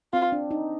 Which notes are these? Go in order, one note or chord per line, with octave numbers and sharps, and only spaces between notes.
C4 F4
D4
D#4